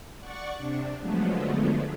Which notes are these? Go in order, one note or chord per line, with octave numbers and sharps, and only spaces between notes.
D5 F#5 C#6
C3 D4
D3 F3 F#3 G#3 A3 B3